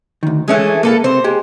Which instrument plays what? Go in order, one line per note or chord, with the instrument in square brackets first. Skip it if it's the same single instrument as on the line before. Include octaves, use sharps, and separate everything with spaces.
[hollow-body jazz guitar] D2 D#3
[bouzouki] E3 A3 G#4 [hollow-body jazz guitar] G#3 C#4
[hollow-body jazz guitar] A#3 [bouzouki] F4 A4 B4
[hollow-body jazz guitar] C3 C4 [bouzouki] C5
[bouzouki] G#3 [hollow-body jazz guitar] G4